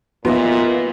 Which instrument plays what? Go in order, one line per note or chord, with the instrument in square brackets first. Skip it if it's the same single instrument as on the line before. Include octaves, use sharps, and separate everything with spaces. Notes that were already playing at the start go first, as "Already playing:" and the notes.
[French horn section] A#2 [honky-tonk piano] B3 [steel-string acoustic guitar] F4 D#5 E5